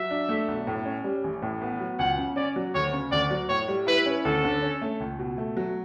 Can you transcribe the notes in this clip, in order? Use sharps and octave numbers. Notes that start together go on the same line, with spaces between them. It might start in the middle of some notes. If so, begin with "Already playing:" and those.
Already playing: F#3 E5
D4
A3
B1
A2
C#4
G3
A1
A2
B3
F#3
C#2 F#5
C#3
C#4 D5
F#3
D2 C#5
C#3
D2 D5
F#3
A2 C#5
G3
E4 B4
C#4
D2 A4
D3
C#4
A3
C#2
B2
A3
F#3